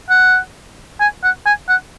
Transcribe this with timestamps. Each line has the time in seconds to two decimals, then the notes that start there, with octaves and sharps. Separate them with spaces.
0.10 F#5
1.00 G#5
1.24 F#5
1.46 G#5
1.69 F#5